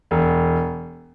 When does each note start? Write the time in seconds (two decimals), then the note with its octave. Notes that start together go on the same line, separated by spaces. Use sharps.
0.11 E1